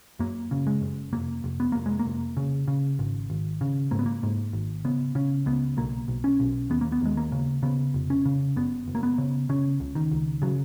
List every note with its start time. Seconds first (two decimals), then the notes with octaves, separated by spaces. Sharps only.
0.19 F#2 A#3
0.51 C#3
0.67 G#3
0.81 F#1
1.13 F1 A#3
1.44 F1
1.60 B3
1.72 F1 A#3
1.86 G#3
1.99 A#3
2.05 F1
2.37 C#3
2.68 C#3
2.99 G#1
3.30 G#1
3.61 C#3
3.91 G#2 A#3
3.99 B3
4.06 A#3
4.23 G#2
4.53 G#1
4.85 C#3 B3
5.15 C#3 C#4
5.46 C#2 B3
5.77 B1 A#3
6.08 B1
6.24 C#4
6.40 B1
6.70 D#2 B3
6.81 A#3
6.92 B3
7.02 D#2 G#3
7.17 A#3
7.32 C#3
7.63 C#3 B3
7.94 F1
8.10 C#4
8.26 C#3
8.56 F#1 B3
8.88 F#1
8.95 A#3
9.03 B3
9.18 C#3
9.49 C#3 C#4
9.80 C#2
9.95 D#3
10.11 C#2
10.42 C#3 F#3